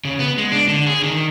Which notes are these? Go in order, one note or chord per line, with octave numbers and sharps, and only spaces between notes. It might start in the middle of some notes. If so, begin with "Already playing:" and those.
C#3
B3
G#3
D4
D3
G#4
D#3